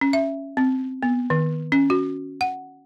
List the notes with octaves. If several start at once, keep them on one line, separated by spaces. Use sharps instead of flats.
C#4
E5
C4
B3
D#3
C#4
F#4
F#5